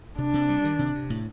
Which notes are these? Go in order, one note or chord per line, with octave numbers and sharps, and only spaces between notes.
C3 D4
C3
G3
D#3
C3
C3
A2